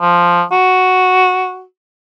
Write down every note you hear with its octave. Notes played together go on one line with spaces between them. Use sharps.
F3
F#4